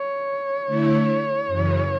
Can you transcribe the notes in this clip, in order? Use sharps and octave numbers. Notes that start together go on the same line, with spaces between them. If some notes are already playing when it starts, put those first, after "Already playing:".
Already playing: C#5
D3 A3 E4
F#2 C#3 E3